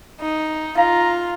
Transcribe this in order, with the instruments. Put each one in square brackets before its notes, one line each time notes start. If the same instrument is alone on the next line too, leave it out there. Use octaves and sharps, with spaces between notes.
[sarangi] D#4
[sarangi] F4 [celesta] F5 [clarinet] A#5